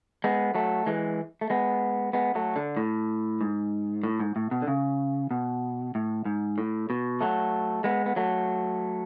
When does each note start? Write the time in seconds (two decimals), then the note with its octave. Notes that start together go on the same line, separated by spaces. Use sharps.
0.24 G#3 B3
0.55 F#3 A3
0.86 E3 G#3
1.41 A3
1.50 G#3 B3
2.13 G#3 B3
2.35 F#3 A3
2.56 D3
2.77 A2
3.41 G#2
4.03 A2
4.20 G#2
4.36 A2
4.51 B2
4.62 D3
4.68 C#3
5.31 B2
5.95 A2
6.25 G#2
6.58 A2
6.90 B2
7.21 F#3 A3
7.84 G#3 B3
8.06 B3
8.16 F#3 A3